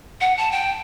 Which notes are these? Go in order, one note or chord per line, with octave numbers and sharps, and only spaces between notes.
F#5
A5
G5